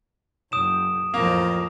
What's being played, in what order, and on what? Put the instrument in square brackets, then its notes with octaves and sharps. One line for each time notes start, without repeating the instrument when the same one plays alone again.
[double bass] F#1 [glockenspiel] D#6 D7 E7
[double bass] A1 F2 [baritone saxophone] F3 [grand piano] A#3 [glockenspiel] A#6 F7